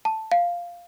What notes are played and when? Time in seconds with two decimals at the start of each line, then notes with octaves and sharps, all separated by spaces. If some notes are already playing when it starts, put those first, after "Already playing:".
0.05 A5
0.32 F5